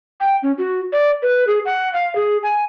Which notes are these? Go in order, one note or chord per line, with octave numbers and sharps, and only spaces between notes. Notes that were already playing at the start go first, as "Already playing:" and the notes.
G5
C#4
F#4
D5
B4
G#4
F#5
F5
G#4
G#5